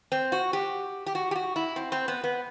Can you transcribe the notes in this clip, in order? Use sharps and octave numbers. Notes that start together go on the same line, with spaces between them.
C4
F#4
G4
G4
F#4
G4
F#4
E4
C4
C4
B3
B3